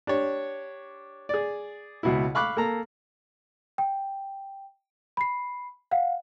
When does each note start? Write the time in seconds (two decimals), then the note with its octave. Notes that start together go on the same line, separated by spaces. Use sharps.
0.07 D4 G4 C#5
1.29 G#4 D5
2.03 C#2 B2 E4
2.35 F5 B5 C#6 D6 F#6
2.57 A#3 A4 A#5
3.78 G5
5.17 B5 C7
5.91 F5 F#5